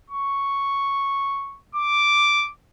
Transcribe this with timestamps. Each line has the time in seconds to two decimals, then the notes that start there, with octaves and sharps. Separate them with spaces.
0.10 C#6
1.75 D6